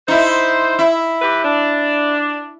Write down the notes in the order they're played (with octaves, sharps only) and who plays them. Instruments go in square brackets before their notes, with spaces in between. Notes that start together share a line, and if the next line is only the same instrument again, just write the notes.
[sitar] D#4 E4 [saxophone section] C5
[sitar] E4
[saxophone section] E3 G4 B4
D4